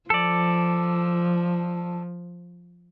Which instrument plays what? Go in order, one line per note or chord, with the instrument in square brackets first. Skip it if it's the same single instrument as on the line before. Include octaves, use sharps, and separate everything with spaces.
[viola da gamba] F3 [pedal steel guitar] A4 D5